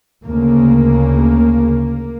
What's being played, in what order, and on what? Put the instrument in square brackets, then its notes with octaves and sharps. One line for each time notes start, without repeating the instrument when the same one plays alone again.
[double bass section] D2 C#3 A#3